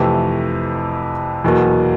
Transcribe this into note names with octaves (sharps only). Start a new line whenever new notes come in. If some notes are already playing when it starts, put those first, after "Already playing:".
Already playing: F2 C3 E3 A3
E2 B2 F#3 A#3